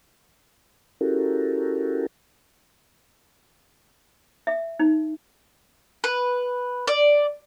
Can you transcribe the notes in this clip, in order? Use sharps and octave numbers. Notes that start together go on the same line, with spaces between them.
C#4 E4 F#4 G4 A4 A#4
E5
D#4
B4
D5